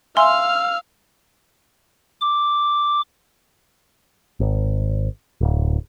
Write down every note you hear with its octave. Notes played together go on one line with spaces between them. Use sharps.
E5 F5 G#5 C6 E6 F6
D6
G#1
D1